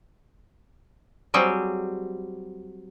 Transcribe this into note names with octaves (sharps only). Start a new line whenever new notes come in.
F#3 G3 C4 G#4